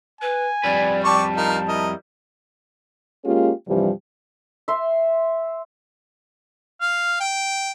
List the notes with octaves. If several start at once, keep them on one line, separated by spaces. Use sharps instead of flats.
B4 G#5
F2 G3 B4 D5
G4 D5 A5 C#6
D#4 F4 A#4 F5
E4 A#4 D#5
G#3 A#3 C#4 F4 G4 G#4
G2 C3 E3 F3 G3
E5 C6
F5
G5